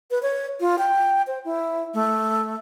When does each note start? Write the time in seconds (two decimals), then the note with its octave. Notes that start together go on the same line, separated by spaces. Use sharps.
0.11 B4
0.23 C#5
0.60 F4
0.79 G5
1.27 C5
1.45 E4
1.94 A3